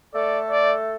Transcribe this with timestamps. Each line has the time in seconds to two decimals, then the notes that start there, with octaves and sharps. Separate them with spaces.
0.14 A3 A4 D5
0.50 D5